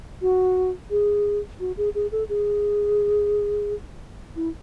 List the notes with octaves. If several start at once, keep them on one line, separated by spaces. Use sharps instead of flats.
F#4
G#4
F#4
G#4
G#4
A4
G#4
E4